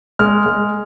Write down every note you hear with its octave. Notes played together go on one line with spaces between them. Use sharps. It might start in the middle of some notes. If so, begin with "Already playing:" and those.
G#3 F6
G#3